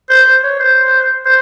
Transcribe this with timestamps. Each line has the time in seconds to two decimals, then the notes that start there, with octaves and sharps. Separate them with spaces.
0.10 C5
0.27 C5
0.43 C#5
0.60 C5
1.26 C5